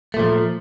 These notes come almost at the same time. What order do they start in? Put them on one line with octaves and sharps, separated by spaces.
A3 A#2 F3